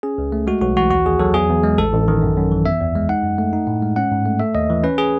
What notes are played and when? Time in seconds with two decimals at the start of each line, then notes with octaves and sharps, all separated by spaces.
0.03 C#4 G#4
0.18 C#2
0.32 A3
0.47 G#3 F#4
0.61 B1 F#4
0.76 E3 F#4
0.91 D#2 F#4
1.06 D#2 G#4
1.19 F#3 A4
1.34 E2 G#4
1.49 E2
1.63 G#3
1.78 A1 A4
1.92 A1
2.08 D#3
2.22 F#2
2.36 F#2
2.51 E3
2.66 B3 E5
2.80 E2
2.95 G#3
3.09 D#4 F#5
3.23 F#2
3.38 A3
3.53 D#4
3.67 A2
3.83 G#3
3.96 C#4 F#5
4.12 G#2
4.26 A3
4.40 A3 E5
4.55 D#2 D#5
4.70 E3
4.84 C#4 B4
4.98 G#4